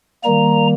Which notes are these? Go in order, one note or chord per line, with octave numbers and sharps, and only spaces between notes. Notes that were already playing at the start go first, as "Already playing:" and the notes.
D#3 G3 A#3 A#5